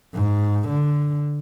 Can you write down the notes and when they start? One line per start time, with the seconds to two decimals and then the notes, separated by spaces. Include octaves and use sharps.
0.14 G#2
0.68 D3